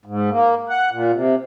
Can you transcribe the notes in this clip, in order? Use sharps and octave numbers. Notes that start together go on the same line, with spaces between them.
G#2
A#3
F#5
A#2
C3